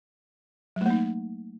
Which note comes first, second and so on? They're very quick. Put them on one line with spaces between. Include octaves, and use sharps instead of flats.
F#3 A3 A#3 D#4